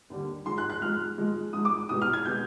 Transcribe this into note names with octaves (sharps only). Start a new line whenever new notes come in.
D#2 D3 G3
G#2 F3 G#3 C6
F#6
F#6
G#2 F3 G#3 F6
G#2 F3 G#3
G#2 F3 G#3 D#6
D6
C2 B2 G#3 D#6
F6
G#6
B2 G#3 G6